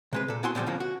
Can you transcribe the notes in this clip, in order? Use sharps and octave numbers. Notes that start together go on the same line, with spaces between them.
C3 G#3 B4
A#2 A4
B3 E4 F#4 A4 G#5 C6
A#2 D3 F3 G3 G#3
D2 B2 F3 A#3 C#4
F#4